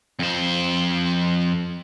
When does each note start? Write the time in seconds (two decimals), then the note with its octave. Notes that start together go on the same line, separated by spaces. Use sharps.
0.19 F2 C5